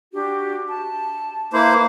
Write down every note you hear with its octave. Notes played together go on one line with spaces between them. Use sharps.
D4 F#4 G4
A5
A#3 E4 B4 C5 F5 D6